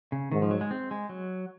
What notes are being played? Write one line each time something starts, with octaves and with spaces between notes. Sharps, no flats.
C#3
G#2 D#3
F3
F#3
G#3
C4
G#3
F#3